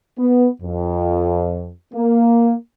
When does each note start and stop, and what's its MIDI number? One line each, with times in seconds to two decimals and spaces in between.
0.18 0.48 59
0.61 1.71 41
1.94 2.53 58